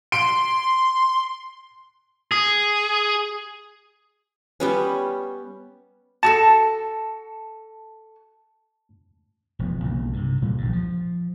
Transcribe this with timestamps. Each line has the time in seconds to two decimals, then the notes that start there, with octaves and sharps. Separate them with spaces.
0.12 C6 D7
2.32 G#4
4.60 G3 B3 C#4
6.23 F#4 G#4 A4 A5
9.59 E1 F3 B3
9.84 B1 C#3 A#3
10.13 G2 C3
10.42 C#2 A#2 E3 G3
10.58 A#1 G2
10.73 F3